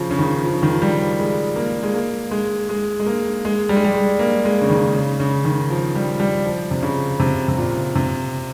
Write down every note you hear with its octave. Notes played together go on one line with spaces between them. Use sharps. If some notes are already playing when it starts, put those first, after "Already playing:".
Already playing: C#3 F3
C#3
D#3
F3
C#3
D#3
F3
G3
G#3
A#3
G#3
A#3
G#3
G#3
G#3
A#3
G#3
G3
G#3
G3
G#3
A#3
G#3
C#3
D#3
C#3
C#3
D#3
F3
G3
G3
F3
C3
C#3
C3
C3
A#2
C3